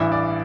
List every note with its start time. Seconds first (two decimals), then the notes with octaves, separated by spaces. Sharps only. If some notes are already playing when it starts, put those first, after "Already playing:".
Already playing: A1 G2 E3 E5
0.12 D5